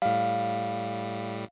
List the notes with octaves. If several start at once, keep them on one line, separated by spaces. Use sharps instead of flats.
A2 G3 F5